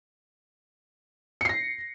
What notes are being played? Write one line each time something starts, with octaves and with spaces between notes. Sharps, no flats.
A#6 C7 C#7